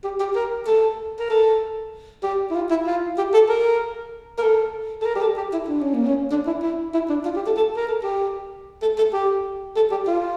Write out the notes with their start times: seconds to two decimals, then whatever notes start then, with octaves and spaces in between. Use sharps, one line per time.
0.04 G4
0.20 G4
0.35 A#4
0.67 A4
1.19 A#4
1.30 A4
2.23 G4
2.51 E4
2.55 F4
2.70 E4
2.86 F4
3.18 G4
3.33 A4
3.49 A#4
4.38 A#4
4.43 A4
5.02 A4
5.06 A#4
5.15 G4
5.21 A4
5.37 G4
5.53 E4
5.68 D4
5.81 C#4
5.94 A#3
6.06 C#4
6.31 D4
6.47 E4
6.62 E4
6.94 E4
7.09 D4
7.25 F4
7.36 G4
7.46 A4
7.56 A4
7.76 A#4
7.88 A4
8.03 G4
8.82 A4
8.98 A4
9.13 G4
9.76 A4
9.91 G4
10.07 F4